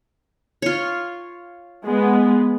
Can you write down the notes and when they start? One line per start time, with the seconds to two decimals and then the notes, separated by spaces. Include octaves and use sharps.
0.62 F4 C#5
1.83 G#3 B3